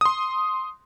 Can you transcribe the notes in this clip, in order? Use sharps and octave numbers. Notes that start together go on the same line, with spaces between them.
C6 D#6